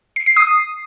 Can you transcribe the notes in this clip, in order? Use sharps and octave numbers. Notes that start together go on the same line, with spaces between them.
C7
C7
D#6